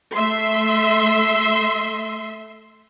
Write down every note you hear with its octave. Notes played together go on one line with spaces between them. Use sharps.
A3 E5 C6